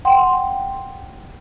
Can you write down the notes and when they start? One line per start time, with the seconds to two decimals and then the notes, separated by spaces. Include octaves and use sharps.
0.05 F#5 G5 C6